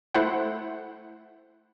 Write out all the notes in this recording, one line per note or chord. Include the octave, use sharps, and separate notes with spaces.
A3 E4 C5 E5 F#5